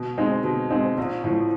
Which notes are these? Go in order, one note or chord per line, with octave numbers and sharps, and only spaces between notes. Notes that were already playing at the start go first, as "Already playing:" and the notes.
Already playing: B2
G#3 C4 D#4
B2
G#3 C4 D#4
A#1
A2 F3